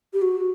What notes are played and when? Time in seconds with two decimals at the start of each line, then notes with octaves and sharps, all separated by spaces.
0.13 G4
0.22 F#4